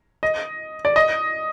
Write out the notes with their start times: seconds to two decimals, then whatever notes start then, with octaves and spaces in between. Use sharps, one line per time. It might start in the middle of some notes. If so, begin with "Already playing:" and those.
0.23 D#5
0.85 D5
0.96 D#5